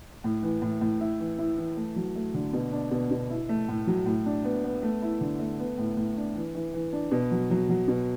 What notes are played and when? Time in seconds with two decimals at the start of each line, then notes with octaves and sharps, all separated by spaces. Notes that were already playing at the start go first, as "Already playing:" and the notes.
0.24 A2
0.42 E3
0.62 A2
0.81 A2
1.01 E4
1.19 E3
1.38 E4
1.57 E3
1.77 A3
1.96 F#3
2.15 A3
2.34 D3
2.53 B2
2.72 D4
2.91 B2
3.11 B2
3.30 E4
3.49 A3
3.68 A2
3.87 F#3
4.06 A2
4.26 D4
4.44 B3
4.64 B3
4.83 A3
5.02 E4
5.21 D3
5.39 A3
5.59 B3
5.78 A2
5.97 A2
6.17 D4
6.35 E3
6.55 E3
6.74 E3
6.93 D4
7.11 B2
7.32 F#3
7.50 F#3
7.69 F#3
7.88 B2